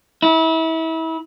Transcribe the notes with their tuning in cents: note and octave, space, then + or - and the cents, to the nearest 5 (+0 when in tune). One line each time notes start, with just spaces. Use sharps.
E4 -30